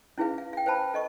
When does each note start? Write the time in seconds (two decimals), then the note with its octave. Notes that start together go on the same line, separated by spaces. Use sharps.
0.18 C#4 E4 G#4 B4 F5
0.38 F5
0.53 F5 G5
0.66 B4 C5 F5 A5 B5
0.94 A4 D#5 C#6